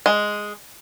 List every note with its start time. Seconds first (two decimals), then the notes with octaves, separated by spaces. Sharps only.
0.06 G#3